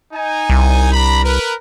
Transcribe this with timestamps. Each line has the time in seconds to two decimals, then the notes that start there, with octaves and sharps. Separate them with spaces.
0.13 D#4 G#5
0.50 C2
0.93 D4 A#5 B5
1.23 A#4 B4